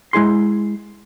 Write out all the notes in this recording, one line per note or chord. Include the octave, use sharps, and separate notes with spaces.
G#3 E4 G#4 C6